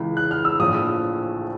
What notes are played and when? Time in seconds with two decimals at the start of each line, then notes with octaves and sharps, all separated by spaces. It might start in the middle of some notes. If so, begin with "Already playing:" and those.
Already playing: C#2 C#3 E3
0.17 F#6
0.31 F6
0.45 E6
0.59 A#1 A2 F3 D#6